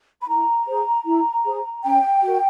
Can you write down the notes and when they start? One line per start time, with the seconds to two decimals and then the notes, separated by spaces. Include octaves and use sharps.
0.21 B5
0.28 E4 A#5
0.67 G#4 C5
1.06 E4
1.45 G#4 C5
1.84 C#4 G5
2.23 F#4 A#4